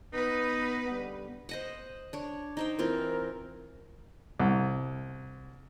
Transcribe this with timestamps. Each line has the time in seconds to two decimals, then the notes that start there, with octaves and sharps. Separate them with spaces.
0.14 B3 D#4 B4
0.89 D3 G3 B3
1.49 C5 D#5 F#5
2.13 D4 C#5
2.57 D#4 C5 G5
2.79 E3 C4 F4 A#4
4.40 C2